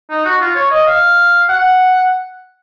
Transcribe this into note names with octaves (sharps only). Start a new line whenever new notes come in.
D#4
F#4
F4
C#5
D#5
F5
F#5